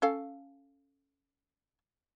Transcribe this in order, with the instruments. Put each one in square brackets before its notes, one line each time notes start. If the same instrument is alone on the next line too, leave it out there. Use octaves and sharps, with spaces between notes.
[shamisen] C#4 A4 F5